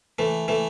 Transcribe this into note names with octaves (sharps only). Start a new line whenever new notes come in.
E3 A3
E3 A3